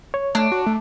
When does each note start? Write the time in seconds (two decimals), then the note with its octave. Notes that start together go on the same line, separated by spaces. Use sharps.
0.14 C#5
0.35 A3 D4
0.52 F#4
0.66 A3